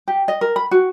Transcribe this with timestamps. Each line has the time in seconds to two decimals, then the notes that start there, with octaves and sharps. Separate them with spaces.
0.08 G4
0.28 D#5
0.41 A#4
0.56 B5
0.71 F#4